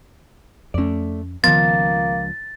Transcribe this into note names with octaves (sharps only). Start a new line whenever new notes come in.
F2 A3 C#4 D5
C#2 D#3 F3 A#3 B3 C6 A6